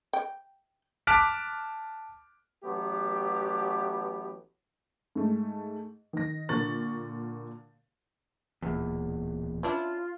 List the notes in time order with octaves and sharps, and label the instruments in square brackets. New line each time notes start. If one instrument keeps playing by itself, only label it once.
[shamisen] G5
[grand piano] A5 D6 F6 F#6 B6 D7
[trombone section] A1 F#3 A3 B3 G4
[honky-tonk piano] G#2 A3
D#3 A#6
A#2 D3 A#4 C#6 A6 F#7
[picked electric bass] D1 A#2 [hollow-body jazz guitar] E2
[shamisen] C#4 D4 E4 [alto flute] F4